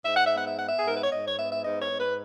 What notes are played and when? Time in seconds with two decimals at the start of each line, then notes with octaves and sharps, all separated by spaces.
0.05 G#2 E5
0.16 F#5
0.26 E5
0.32 B3
0.37 F#5
0.46 E5
0.58 B3 F#5
0.68 E5
0.79 G#4
0.84 G#2 A#4
0.95 B4
1.03 C#5
1.10 G#2 D#5
1.25 C#5
1.38 B3 E5
1.51 E5
1.64 G#2 D#5
1.81 C#5
1.90 G#2
1.99 B4